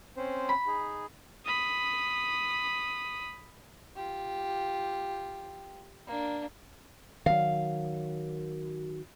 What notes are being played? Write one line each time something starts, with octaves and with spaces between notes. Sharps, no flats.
C4 C#4 C5
B5
D#4 G#4
B5 D#6
F4 G4
A#3 D4
D#3 F#3 F5